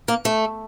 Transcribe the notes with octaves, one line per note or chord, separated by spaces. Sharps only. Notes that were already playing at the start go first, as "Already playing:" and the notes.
A#3
A3